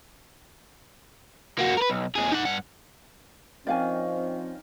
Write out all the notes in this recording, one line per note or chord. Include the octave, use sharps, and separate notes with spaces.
A#3 F#4
A#4 B4
B1
D#2 G#4
D#4 F#5
G2 F#5
D#3 F3 C4 C#4 D5 F5 G#5